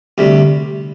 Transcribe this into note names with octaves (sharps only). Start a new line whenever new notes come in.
D2 C3 G3